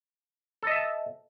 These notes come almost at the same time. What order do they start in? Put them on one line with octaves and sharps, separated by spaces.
A4 D#5 E5 A5